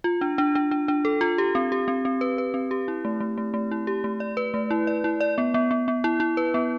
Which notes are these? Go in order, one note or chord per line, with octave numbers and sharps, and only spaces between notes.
F4
D4
D4
D4
D4
D4
A4
F4
G4
C4
G4
C4
C4
B4
B4
C4
G4
E4
A3
A3
A3
A3
E4
G4
A3
D5
B4
A3
E4
D5
E4
D5
B3
B3
B3
B3
E4
E4
B4
B3